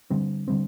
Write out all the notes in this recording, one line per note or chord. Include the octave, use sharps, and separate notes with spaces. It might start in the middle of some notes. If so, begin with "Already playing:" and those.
D3 G3 C4
D3 G3 C4